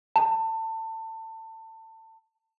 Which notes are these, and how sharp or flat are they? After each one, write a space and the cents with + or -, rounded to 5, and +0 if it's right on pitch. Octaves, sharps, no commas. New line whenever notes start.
A5 +25